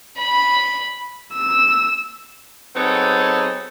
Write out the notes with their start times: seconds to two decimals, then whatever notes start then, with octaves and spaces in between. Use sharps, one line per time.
0.17 B5
1.34 E6
2.75 F#3 B3 C4 D#4 G#4 A4